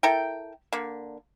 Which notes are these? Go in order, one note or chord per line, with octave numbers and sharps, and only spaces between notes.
E4 A4 A#4 G5
D3 A#3